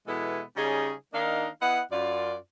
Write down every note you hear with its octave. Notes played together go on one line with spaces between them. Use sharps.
B2 E3 G#3 B3 E4 A4
C#3 G3 C#4 D#4 G#4
D#3 A#3 D4 D#4 D#5 F5
B3 E4 D#5 F#5
F#2 F4 D5